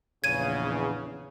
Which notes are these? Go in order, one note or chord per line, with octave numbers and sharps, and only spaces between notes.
A#1 E2 C#3 G#6 D#7